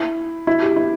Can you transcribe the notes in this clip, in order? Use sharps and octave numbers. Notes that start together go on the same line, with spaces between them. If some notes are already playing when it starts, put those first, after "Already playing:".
Already playing: E4
E4
G4
E4